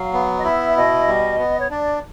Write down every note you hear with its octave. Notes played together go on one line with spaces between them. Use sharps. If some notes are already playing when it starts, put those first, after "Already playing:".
Already playing: F#3 F5
B3
D#5
E4 E5
B2 D#5
G3
B3
C#5
D4 D5